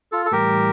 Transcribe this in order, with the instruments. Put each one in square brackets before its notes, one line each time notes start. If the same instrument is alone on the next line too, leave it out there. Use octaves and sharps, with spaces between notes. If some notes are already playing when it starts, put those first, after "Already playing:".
[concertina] F4 A4
A4
[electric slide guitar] A2 E3 G3 [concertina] G4 A#4